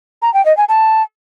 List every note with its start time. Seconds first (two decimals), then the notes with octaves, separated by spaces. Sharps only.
0.22 A#5
0.34 G5
0.46 D#5
0.57 G#5
0.69 A5